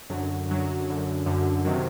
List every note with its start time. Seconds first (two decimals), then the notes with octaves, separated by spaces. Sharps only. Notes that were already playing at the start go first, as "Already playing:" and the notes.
0.10 F#2 D3 F#3
0.48 F#2 D3 F#3
0.88 F#2 D3 F#3
1.26 F#2 D3 F#3
1.65 C3 D#3 F#3